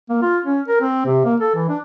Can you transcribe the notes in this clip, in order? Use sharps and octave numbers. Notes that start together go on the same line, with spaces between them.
A#3
F4
C#4
A#4
C4
C3
A#3
A4
E3
D4